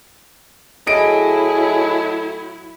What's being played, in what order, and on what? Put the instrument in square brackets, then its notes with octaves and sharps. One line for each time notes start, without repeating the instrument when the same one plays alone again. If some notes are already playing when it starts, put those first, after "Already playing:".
[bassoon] A2 [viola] F#3 E4 [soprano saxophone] G#4 [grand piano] D#5 D7